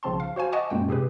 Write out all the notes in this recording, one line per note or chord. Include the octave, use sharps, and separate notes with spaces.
B1 C#3 F3 C4 A5 C6
F5
F#4 C5 F5 G#5
D#5 F#5 G#5 A5 C#6 D6
F#2 A#2 G#3 G5
C3 G4 G#4 B4